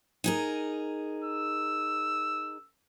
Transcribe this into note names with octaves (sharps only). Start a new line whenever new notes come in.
D#4 G#4 A#4
E6